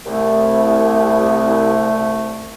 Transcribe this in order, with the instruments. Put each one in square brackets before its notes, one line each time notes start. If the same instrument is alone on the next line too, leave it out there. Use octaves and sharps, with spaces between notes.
[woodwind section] C2 [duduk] A3